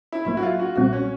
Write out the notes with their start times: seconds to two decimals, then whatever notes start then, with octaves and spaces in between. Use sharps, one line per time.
0.12 E4
0.25 A#1 A2 F#3 A#3 E4
0.37 F#4
0.43 F4
0.59 F#4
0.76 B1 A#2 G3 C4 F#4
0.93 C#4